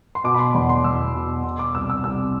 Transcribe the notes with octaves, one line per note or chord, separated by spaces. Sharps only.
C6
B2 D6
B5
C6
E2 B5
C6
E2 E6
B2
B2 C6
D6
C2 E6
E6
C2 E6